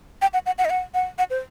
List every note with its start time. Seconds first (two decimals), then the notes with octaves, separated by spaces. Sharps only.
0.22 G5
0.33 F#5
0.46 F#5
0.58 F#5
0.65 D#5
0.70 F#5
0.94 F#5
1.18 F#5
1.30 C5